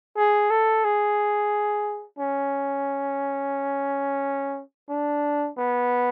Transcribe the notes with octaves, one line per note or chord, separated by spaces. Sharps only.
G#4
A4
G#4
C#4
D4
B3